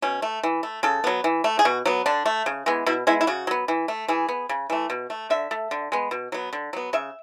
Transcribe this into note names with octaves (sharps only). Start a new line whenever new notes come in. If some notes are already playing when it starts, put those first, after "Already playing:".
B2 C#4
A3
E3
A3
C#3 A4
F#3 B3
E3
A3
G#4
B2 F#4
F#3 B3
D3 D4
A3
C#3
E3 G#3 B3
B2 E4
G#3 B3 E4
E4
C#3 F#4
F#3 B3
E3
A3
E3 G#4
B3
C#3
E3 A3
B2
A3
D3 E5
A3
D3
G#3 B3
B2
F#3 B3
D3
F#3 B3
C#3 E5